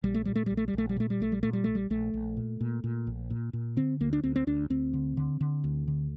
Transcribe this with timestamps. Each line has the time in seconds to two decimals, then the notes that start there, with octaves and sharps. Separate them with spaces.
0.04 A#1 G3
0.14 A3
0.25 A#2 G3
0.36 A3
0.46 A#1 G3
0.57 A3
0.68 G3
0.74 A#1 A3
0.89 G3
0.96 A#2 A3
1.10 G3
1.20 A#1 A3
1.32 G3
1.43 A#2 A3
1.53 G3
1.64 A#1 A3
1.75 G3
1.90 A#1 A3
2.14 A#1
2.37 A#2
2.61 A#2
2.84 A#2
3.07 A#1
3.30 A#2
3.53 A#2
3.77 D3 C4
4.00 D2 A#3
4.13 D4
4.24 D2 C4
4.36 C4
4.47 D2 D4
4.70 D2 C4
4.93 D3
5.17 D3
5.41 D3
5.64 D2
5.88 D3